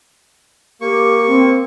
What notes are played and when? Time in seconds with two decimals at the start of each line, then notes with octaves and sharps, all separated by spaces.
0.81 A#3 G4 C#6
1.27 C4